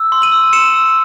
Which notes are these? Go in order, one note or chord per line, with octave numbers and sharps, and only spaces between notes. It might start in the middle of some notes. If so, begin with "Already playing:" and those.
Already playing: E6
C6
D#7 F#7
E6
C6 C#7 E7
E6